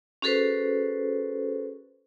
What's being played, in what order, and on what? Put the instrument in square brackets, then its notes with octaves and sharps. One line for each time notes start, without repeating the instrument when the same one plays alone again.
[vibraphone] C#4 F#4 G#4 A4 B4 C5